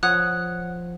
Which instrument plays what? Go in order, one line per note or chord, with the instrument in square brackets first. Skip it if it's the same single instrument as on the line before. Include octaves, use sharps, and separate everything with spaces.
[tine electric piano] F3 [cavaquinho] C#5 F#5 D#6 [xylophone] F#6